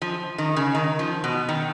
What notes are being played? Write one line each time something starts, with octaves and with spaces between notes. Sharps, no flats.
F3
D#3
C#3
D#3
F3
B2
D#3